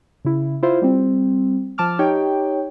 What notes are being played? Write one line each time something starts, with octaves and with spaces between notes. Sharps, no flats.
C#3 E4
E4 F4 C5
G3 C4
F3 A5 D6 F6
D#4 G4 C#5 G5